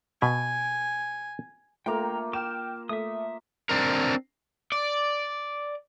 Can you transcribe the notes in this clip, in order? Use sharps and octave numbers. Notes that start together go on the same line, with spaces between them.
B2 B4 G#5
A3 A#3 F4 G5 A#5
G5 D6 F6 E7
A3 E5 D#6
C4 D4 A#4
D5